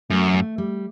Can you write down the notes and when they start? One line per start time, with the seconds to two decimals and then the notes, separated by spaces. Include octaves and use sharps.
0.10 F#2 A3
0.34 A3
0.58 G3